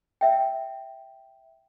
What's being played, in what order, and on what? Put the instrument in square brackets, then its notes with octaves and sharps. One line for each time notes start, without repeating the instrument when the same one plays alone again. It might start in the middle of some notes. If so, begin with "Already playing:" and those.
[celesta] E5 G5